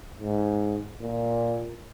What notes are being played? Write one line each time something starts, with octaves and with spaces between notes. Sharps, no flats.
G#2
A#2